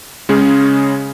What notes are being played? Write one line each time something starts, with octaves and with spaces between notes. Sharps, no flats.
C#3 G#3 C#4 G#4